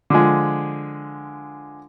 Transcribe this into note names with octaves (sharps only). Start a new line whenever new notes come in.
D3 F3 G#3